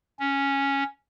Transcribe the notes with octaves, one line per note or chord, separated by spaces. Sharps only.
C#4